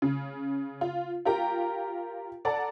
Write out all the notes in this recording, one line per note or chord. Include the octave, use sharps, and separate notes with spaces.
C#3
F4
F4 G4 A#4 G5 A#5
A4 D5 F#5 A5 A#5